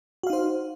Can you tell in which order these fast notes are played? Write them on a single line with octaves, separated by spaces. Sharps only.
F#4 F5 D#4 C5